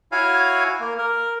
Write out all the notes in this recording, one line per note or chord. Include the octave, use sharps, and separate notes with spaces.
E4 F#4 C#5 F5 G#5
A#3
A#4